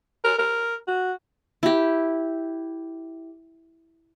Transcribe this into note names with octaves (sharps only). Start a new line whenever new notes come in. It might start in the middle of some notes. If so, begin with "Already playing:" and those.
A#4
A#4
F#4
E4 G4